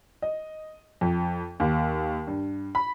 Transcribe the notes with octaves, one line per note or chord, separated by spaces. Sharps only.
D#5
F2
D#2
G2
B5